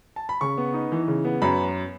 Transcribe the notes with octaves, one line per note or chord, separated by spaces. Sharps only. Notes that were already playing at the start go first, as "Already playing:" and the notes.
A5
B5
C#3 C#6
B3
D#4
E3
C#3
B3
F#2 B5